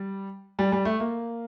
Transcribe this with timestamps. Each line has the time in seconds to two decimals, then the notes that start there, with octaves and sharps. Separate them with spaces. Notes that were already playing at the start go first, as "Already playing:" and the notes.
Already playing: G3
0.59 G3
0.72 G3
0.85 A3
1.00 A#3